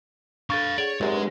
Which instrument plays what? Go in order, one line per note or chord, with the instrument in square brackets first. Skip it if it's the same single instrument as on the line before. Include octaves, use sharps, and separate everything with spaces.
[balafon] D4 A4 [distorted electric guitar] B4 F5 [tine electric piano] C#6 A6
[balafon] G#4 F#5 [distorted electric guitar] C#5 [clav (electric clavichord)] D5
[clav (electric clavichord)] G#1 F#2 [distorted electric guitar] G#3 [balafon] G4
[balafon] D4 B4 C#5